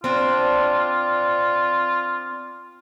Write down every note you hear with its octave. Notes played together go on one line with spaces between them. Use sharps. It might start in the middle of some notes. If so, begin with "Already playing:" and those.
C4 D4 F4